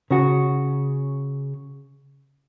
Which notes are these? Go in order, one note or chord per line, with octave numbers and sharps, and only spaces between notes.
C#3 F#4